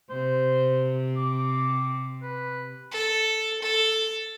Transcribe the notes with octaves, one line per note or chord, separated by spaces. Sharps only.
C3 C5
D6
B4
A4
A4